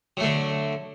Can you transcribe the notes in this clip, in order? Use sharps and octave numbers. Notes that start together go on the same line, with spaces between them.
D3 F#3 A3